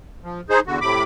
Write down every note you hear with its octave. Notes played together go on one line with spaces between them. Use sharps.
F3
D#4 G#4 C5
E2 D3 F#4
A2 C3 B5 D6